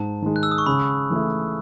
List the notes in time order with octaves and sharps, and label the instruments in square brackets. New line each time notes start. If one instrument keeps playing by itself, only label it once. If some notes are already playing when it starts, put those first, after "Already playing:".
Already playing: [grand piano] G#2 [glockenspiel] A5
[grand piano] D#3 G#3
[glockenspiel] F#6
E6
D#6
C#6
[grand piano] C#3 [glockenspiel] B5
[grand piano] E3 A3 E4